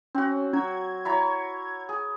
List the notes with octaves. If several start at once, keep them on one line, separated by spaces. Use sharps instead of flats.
C4 C#4 F#4
F#3 G#6
E4 C#5 A#5
G#4